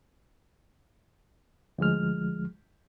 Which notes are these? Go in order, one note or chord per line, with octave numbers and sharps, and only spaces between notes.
D2 F3 G#3 F6